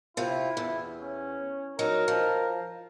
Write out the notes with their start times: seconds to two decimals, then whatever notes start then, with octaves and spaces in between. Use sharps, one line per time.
0.17 C3 E4 F4
0.57 E2
1.00 C#4
1.79 F#3 D#4 A#4
2.08 F3